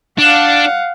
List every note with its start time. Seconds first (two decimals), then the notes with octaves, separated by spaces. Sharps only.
0.19 D4 F5 F#5